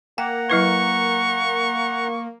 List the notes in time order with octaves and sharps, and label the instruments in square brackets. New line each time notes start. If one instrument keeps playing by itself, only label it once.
[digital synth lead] A#3 [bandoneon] F#5 A#5 [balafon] G5
[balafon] F#3 E4 B4 [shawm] C#6